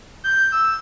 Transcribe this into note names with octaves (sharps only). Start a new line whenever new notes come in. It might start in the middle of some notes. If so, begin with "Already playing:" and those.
G6
E6